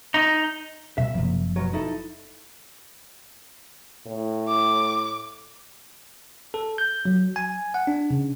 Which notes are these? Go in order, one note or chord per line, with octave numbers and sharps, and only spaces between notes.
D#4
B2 G3 E5
F#1 C2 A#2 F3 A#3
B2 F#3
D#4 E4 A4
A2
D6
A4
G6
F#3
G#5
F#5
D4
C#3